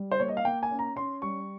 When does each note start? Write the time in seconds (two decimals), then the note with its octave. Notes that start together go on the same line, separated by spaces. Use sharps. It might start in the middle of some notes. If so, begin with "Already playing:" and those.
Already playing: G3
0.11 C5
0.20 A#3 C#5
0.28 D#5
0.37 F5
0.45 A#3 G5
0.63 G#5
0.71 C#4
0.79 A#5
0.96 C#4 C6
1.22 G3 C#6